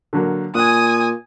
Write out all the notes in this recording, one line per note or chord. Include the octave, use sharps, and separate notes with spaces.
D3 F#3 A#3
A#2 G#5 D#6 F#6